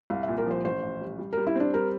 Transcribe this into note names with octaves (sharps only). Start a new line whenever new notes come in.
C2 F5
E5
A#2
A#4
F3 C5
A1 C5
A1
G3
G3
A#4
G3
E4
C4 D4
G3 A#4